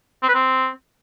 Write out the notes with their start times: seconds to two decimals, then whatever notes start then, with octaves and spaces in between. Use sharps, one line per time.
0.23 C4
0.29 B4
0.35 C4